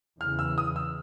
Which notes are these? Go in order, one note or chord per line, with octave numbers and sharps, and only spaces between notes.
E2 C#3 E3 F6
E6
D#6
E6